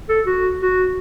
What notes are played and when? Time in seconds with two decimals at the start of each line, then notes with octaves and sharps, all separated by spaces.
0.09 A4
0.26 F#4
0.61 F#4